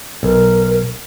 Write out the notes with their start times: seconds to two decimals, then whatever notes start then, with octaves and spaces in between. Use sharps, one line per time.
0.23 B1 A#4